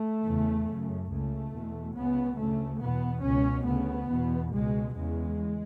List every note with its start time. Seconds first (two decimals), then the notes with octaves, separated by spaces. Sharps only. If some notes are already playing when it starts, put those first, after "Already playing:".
Already playing: A3
0.23 E2 C#3
0.66 F#2 C#3
1.09 C#2 C#3 A3
1.52 E2 B2
1.95 C#2 C#3 B3
2.38 D2 C#3 A3
2.81 E2 B2 B3
3.23 C#2 B2 C#4
3.67 D2 C#3 B3
4.10 E2 B2
4.53 C#2 B2 G#3
4.96 E2 C#3 G#3